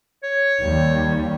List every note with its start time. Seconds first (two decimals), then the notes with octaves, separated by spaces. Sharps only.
0.23 C#5
0.62 D#2 G3